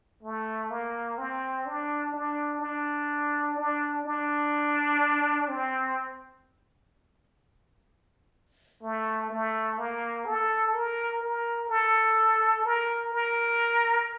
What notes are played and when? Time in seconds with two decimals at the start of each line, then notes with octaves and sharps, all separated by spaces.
0.23 A3
0.70 A#3
1.18 C4
1.66 D4
2.14 D4
2.61 D4
3.57 D4
4.05 D4
5.48 C4
8.83 A3
9.30 A3
9.78 A#3
10.26 A4
10.74 A#4
11.22 A#4
11.70 A4
12.65 A#4
13.13 A#4